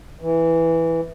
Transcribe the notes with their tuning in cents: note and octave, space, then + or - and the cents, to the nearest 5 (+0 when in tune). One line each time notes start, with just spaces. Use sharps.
E3 +0